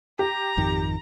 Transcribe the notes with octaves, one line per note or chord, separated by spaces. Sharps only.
G4 A#5
G#1 F2 D#3